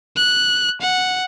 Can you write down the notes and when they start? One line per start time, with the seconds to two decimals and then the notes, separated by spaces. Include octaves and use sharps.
0.17 F#6
0.81 F#5